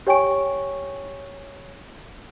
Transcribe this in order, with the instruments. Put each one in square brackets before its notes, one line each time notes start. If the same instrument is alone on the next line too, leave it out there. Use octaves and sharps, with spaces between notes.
[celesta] G4 C#5 G5 G#5 C#6 D7